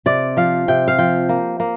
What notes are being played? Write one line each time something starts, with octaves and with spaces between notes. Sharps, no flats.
C3 D5
F3 F5
C3 G5
F5
F3 G5
A#3
A#3